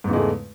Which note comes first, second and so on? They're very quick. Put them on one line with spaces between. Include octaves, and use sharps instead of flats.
G#2 E2 C#3 G#3 A3